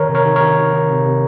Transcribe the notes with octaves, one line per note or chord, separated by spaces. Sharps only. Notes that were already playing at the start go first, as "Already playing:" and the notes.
Already playing: D#3 A#4 C#5
C3
A#4 C#5
D#3
A#4 C#5
D#3
D#3
D#3
C3
C3